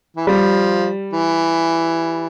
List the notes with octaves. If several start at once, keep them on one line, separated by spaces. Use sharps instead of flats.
E3
F3 G3
E3